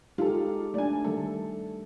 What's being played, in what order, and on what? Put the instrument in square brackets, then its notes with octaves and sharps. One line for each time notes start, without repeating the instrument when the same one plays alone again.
[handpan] G#3 D#4 G4 [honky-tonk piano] F4 A4
[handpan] A3 D4 [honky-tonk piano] D5 G#5
[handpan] D#3 G3 A3 [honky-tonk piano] A4